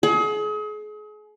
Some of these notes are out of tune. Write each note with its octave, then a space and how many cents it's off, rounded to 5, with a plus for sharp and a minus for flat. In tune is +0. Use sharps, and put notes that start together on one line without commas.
G#4 +35